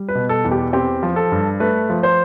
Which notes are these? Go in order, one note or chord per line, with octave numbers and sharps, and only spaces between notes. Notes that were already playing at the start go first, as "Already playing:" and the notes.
Already playing: G3
B4
B2
A4
E2
G4
C4 G4
F3
A4
G2
A3 B4
F3
C5